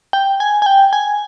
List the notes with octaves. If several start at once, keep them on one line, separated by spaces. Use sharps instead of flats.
G5
G#5
G#5
G5
G#5